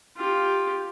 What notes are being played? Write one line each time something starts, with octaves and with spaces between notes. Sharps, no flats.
F4 G4